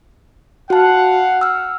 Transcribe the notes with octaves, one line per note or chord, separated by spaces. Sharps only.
F#4 F5 F#5 A5
E6 F6